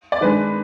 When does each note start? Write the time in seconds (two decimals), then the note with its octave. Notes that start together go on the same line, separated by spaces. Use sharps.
0.12 D5
0.21 D#3 G#3 D4 B4